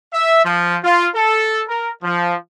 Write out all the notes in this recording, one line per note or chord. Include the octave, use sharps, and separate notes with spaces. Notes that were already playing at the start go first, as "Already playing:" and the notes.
E5
F3
F4
A4
A#4
F3